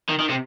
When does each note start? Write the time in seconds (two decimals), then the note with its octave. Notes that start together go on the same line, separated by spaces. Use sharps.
0.09 D#3
0.20 D#3
0.29 C3